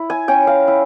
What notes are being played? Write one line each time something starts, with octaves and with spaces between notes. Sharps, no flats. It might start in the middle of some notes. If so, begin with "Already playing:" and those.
Already playing: E4
G#5
C#4 G5
F5
E4